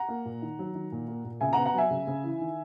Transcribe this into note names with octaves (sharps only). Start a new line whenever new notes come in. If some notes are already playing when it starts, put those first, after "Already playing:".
Already playing: F#5 A#5
A#3
A#2
D#3
F#3
D#3
A#2
A#3
A#2
C#3 E5 G#5
F#5 A#5
B3
F#5 A#5
F#3 E5 G#5
C#3
C#3
E3
D#3